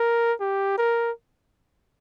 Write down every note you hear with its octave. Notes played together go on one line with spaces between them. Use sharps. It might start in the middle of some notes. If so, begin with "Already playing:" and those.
Already playing: A#4
G4
A#4